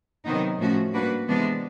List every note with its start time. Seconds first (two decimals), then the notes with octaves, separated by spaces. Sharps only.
0.25 C3 D#3 F#3 B3 D#4
0.58 A2 F3 A3 C#4 F#4
0.93 G3 A#3 D4 F#4 B4
1.28 C3 E3 G#3 B3 D4